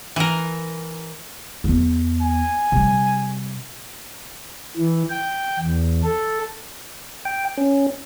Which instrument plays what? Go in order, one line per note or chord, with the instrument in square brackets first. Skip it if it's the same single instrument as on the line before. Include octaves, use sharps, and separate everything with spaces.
[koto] E3 A#4
[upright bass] E2 B3
[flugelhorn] G#5
[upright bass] C3 G3
[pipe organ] E3
G5
E2
A4
[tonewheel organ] G5
C#4